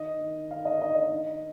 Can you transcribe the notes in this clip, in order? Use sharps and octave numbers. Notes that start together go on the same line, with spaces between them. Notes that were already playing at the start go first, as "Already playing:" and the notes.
Already playing: D#3 D#5
D#3
D#3 F5
D#5
D#4 D#5
D#5
D#3